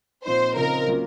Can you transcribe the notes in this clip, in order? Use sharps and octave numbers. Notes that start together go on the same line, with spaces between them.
A#2 F3 C4 D#4 C5
C#3 F3 C4 D#4 A#4
F#3 A#3 C#4 F4